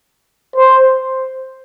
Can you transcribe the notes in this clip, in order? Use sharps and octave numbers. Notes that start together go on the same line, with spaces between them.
C5